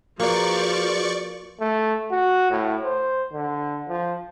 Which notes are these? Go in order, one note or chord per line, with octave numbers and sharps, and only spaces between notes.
F3 A#3 F#4 G#4 B4 D5 C#6
A3
F#4
A2
C5
D3
F3